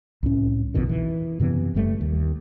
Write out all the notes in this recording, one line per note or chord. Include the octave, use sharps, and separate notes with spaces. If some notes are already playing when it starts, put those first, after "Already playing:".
C2 A2 C#4
A#1 F2 B2 D#3
E3
F#2 C3 E3 B3
F#1 F#2 G3 A3
D#2